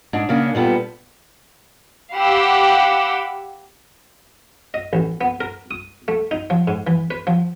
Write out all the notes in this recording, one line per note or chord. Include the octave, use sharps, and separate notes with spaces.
G#2 D4
C#3 A#3 C#4 D4
A#2 G3 B3 A4
G4 F5 F#5 B5 E6
D#5
A1
B3
A#4
D#6
A3
D#4
F3
G#2
E3
B4
F3